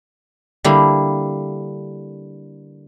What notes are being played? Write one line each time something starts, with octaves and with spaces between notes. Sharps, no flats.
D3 G3 A#3 E4